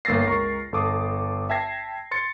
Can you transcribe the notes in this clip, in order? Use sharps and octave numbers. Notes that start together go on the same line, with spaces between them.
G1 A#3 E6 A6 A#6 C7
C#2 A#4 C#6
G1 A4 D6 D#6
E5 G5 A5 G#6 A#6 C7
C6 A6 C#7